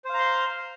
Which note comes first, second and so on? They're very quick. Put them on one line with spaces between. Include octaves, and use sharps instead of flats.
C5 F5 A#5 C6